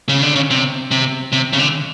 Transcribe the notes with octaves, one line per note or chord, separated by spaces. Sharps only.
C#3
D3
C#3
C3
C3
C3
C#3
D3